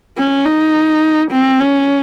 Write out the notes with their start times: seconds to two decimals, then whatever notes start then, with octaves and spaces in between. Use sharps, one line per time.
0.17 C#4
0.46 D#4
1.32 C4
1.60 C#4